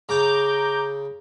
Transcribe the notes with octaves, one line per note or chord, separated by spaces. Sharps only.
C#3 A#5 D6 G6